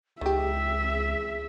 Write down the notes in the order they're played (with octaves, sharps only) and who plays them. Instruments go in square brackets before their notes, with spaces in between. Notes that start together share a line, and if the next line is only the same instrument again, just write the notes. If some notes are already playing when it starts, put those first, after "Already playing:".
[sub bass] C#2 [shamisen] D#3 G4 [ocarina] G#4 [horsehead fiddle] E5